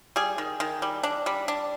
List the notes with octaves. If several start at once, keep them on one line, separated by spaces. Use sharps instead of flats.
G3 G#4
D#3
D#3
G3
D4
G3
D4